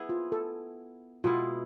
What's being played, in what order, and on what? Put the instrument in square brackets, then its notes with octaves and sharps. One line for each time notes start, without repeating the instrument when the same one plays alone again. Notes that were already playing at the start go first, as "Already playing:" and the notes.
Already playing: [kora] B3 E4 G#4
[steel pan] F4
A4
[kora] B2 G#3 B3 E4 [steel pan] F4